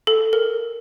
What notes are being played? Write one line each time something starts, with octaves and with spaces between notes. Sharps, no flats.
A4
A#4